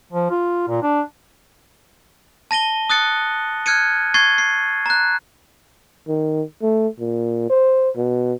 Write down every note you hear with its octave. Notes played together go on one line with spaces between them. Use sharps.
F3
F4
A#2
D4
A5 A#6 D#7 G7
D#6 F#6 A6 C#7
F6 F#6 G#6 C#7 D#7
C#6 G#6 A6 C7 D#7
C7
A#5 F#6
D#3
A3
A#2
C5
B2